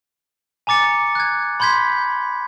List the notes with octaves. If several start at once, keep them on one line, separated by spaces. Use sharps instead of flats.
G#5 A#5 D6 A6 C#7
F#6 G#6
B5 C6 G6 G#6 B6